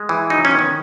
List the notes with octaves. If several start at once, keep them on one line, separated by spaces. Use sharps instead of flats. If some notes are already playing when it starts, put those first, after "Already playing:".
Already playing: G#3
E3
F#3 D#4
C#4
D#3
B3